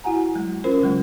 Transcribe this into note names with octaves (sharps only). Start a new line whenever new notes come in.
E4 F#4 F#5 G#5 A#5
F#3 G#3
C#4 F4 A#4 C5
C#3 F#3 G#3